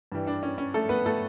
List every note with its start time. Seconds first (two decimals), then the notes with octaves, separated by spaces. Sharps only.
0.12 G2 E3 G3
0.27 D4
0.43 C#4
0.58 C#4
0.74 A3 A4
0.89 B3 B4
1.06 A3 A4